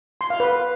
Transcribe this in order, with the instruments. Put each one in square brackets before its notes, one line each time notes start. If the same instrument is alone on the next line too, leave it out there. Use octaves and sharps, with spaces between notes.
[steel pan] C6
F5
B4